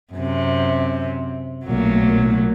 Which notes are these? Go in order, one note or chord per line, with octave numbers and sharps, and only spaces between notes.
F#2 C3
B1 A#2 F#3 A3 A#3